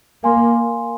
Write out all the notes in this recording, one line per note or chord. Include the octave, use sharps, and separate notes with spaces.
A#3 A#4 F5 G#5 C6